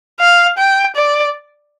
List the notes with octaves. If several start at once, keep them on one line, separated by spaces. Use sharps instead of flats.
F5
G5
D5